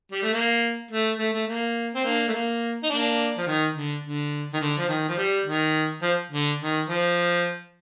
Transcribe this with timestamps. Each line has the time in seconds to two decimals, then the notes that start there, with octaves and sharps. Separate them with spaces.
0.12 G3
0.23 A3
0.34 A#3
0.91 A3
1.19 A3
1.33 A3
1.47 A#3
1.95 C4
2.04 A#3 D4
2.28 A3
2.33 A#3
2.83 D#4
2.90 A#3 D4
3.38 F3
3.47 D#3
3.75 D3
4.04 D3
4.54 D#3
4.60 D3
4.78 F3
4.88 D#3
5.08 F3
5.18 G3
5.46 D#3
6.03 F3
6.31 D3
6.60 D#3
6.89 F3